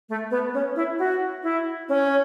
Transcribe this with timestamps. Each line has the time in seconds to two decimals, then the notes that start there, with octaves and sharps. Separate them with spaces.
0.09 A3
0.31 B3
0.54 C#4
0.76 E4
0.99 F#4
1.43 E4
1.89 C#4